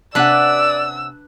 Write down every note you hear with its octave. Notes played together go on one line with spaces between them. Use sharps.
C3 C#4 D4 B4 D5 F#5 E6